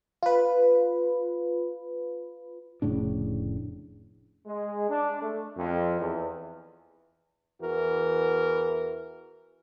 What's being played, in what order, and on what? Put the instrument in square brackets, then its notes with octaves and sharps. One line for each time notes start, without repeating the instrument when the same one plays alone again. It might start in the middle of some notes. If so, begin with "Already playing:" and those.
[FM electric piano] F4 B4
[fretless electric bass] F1 A2 C#3 D4
[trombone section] G#3
D4
A3
F2
E2
E2 E3 F#4 A#4